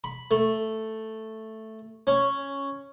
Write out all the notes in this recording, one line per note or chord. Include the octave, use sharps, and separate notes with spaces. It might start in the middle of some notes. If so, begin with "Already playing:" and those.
B5
A3
C#4